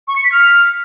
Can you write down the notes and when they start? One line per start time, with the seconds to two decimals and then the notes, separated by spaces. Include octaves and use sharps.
0.08 C#6
0.16 C#7
0.24 B6
0.32 F6